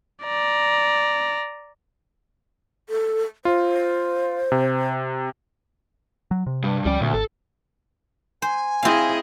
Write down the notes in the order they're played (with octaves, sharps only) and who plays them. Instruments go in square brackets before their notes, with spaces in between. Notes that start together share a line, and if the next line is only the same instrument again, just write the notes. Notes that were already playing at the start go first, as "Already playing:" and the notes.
[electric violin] D5 A#5
[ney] A4
[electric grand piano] F4 [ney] C5
[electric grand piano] C3
[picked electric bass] F#3
C3
[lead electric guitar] G2
[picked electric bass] C#2 F3 C#4 [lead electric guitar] G3 D5
[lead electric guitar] D2 [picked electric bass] A#2
[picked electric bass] G#1 [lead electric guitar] A4
[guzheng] C5 [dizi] G#5
[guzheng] C4 F5 [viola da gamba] E4 G#4 D#5